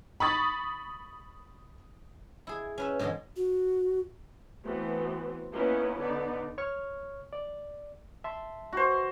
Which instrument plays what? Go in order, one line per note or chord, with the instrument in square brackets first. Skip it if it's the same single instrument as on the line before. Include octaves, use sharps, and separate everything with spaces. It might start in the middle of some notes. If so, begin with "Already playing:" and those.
[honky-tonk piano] B5 C#6 D#6 A6
[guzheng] E4 G#4
C#4 B4 E5
G#2 B2 D3 E3 G#3
[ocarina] F#4
[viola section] E3 A3 B3 C4 F#4
A#3 B3 C#4 D#4 E4
D3 B3 D#4 D5
[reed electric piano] C#5 C#6 F6
D5
E5 A5 C6
[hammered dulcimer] F#4 C5